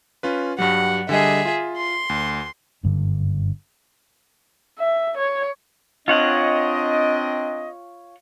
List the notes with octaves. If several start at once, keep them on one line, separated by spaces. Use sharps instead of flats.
C#4 F4 B4
G2 F#3 G3 F#5
D3 G3 G#4 D#5 E5
F4
C6
D2
F#1 G2 D3
E5
C#5
C4 D4 F4 C#5 D#5 F#5